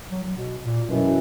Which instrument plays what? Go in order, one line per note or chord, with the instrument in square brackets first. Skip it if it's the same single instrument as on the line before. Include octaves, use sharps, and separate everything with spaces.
[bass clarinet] F#3
F#3
B2
A#2
[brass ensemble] F#2 E3 [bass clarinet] B2